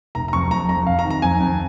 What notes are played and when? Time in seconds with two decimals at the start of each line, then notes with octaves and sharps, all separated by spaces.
0.15 F1 A#5
0.28 A#5
0.33 F2 C#6
0.51 F2 A#5
0.69 F2 A#5
0.87 F2 F5
0.99 A#5
1.05 D#3
1.10 A#5
1.22 F2 G#5
1.40 F2